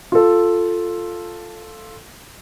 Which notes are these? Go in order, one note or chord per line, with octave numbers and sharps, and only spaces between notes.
F4 A4